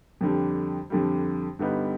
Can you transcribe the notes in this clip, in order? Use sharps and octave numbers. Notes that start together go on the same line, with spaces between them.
F2 D3 G3
F2 D3 G3
G2 D3 G3 B3 D#4